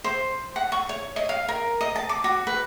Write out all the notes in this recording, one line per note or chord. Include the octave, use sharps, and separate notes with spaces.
C5
F#5
C#6
C#5
D#5
F5
A#4
D#5
A5
D6
F#4
B4